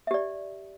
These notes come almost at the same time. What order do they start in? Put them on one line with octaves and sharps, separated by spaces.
E5 G4 D5